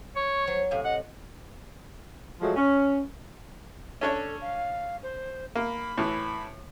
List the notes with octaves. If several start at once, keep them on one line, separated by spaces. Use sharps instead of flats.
C#5 C#6
F#3 C5
A2 C3 F5 G#5
D#5 F#5
F3 F#3 G#3 A3 F#4
C#4
C#4 D4 A4 C#5
F5
C5
A#3 B5
A2 E3